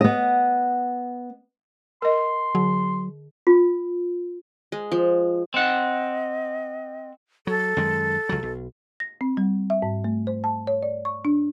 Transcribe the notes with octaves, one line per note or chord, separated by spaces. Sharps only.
B3 D#5
A#4 D#5 C6
D3 F#3
F4
G#3
F3
C4 D#5 F#5
F#3 A4
F#2 D#3 G#3
C#2 F#3
B1
A#6
C4
G3
E5
G#2
A3
C5
A5
C#5
D5
C#6
D4